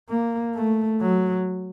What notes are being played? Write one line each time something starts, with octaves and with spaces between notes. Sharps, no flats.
A#3
A3
F#3